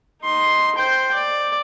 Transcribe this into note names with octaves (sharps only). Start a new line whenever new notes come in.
D#4 C6
C5 G5
D5